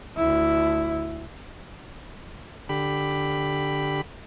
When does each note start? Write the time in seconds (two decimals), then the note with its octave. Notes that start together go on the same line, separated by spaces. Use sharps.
0.17 D2 E4
2.69 D3 G4 B5